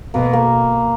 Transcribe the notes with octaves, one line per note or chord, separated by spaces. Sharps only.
B2 A#3
A#3